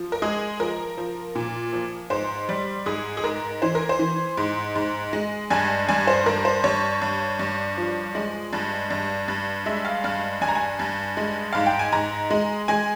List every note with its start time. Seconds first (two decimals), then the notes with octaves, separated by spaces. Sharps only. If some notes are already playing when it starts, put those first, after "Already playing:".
Already playing: F3
0.12 A#4
0.22 G#3 G#4
0.60 F3 A#4
0.97 F3
1.35 A#2
1.73 F3
2.10 G#2 C5
2.49 G3
2.86 G#2 G#4
3.17 G#4
3.24 G#2 A#4
3.62 E3 C5
3.75 A#4
3.89 C5
3.99 E3
4.37 G#2
4.76 G#2
5.13 G#3
5.50 G2 G#5
5.88 G2 G#5
6.07 C5
6.26 G2 A#4
6.45 C5
6.64 G2 C#5
7.02 G2
7.39 G2
7.78 F3
8.15 G#3
8.53 G2
8.90 G2
9.28 G2
9.66 G#3 E5
9.85 F5
10.04 G2 F5
10.41 G2 G#5
10.49 A#5
10.55 G#5
10.79 G2
11.17 G#3
11.53 G#2 F5
11.66 G5
11.79 G#5
11.92 G#2 A#5
12.30 G#3
12.68 G#3 G#5